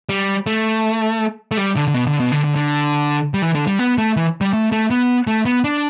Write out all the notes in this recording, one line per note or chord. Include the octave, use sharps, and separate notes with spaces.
G3
A3
A3
G3
D3
D3
B2
D3
B2
D3
D3
D3
G3
E3
D3
G3
B3
A3
E3
G3
A3
A3
B3
A3
B3
D4